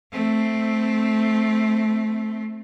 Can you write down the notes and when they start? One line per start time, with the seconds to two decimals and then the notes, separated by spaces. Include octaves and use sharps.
0.12 A3 C4